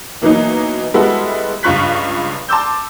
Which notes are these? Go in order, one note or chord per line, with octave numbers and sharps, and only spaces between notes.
B2 E3 F#3 A#3 D#4
G3 G#3 B3 E4 F#4 A4
C#2 G2 F4 C#6 F#6 B6
A5 C6 D6 E6 G6